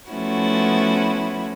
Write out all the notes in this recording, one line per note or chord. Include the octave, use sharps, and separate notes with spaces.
F3 A3 B3 C#4 E4 F#4